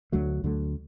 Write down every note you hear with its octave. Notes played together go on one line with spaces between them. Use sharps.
D2 D3 F#3 A3
D2 D3 F#3 A3